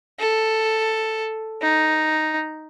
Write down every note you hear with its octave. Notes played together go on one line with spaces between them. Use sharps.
A4
D#4